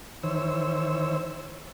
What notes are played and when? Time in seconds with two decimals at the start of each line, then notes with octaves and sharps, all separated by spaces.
0.23 D#3 E3 C5 C#5 E6